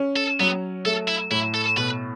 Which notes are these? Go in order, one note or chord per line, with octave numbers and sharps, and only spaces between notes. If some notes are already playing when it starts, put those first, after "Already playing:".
Already playing: C#4
A4
F#3 B3
A3 A4
E4
A2 E4
A4
B2 B4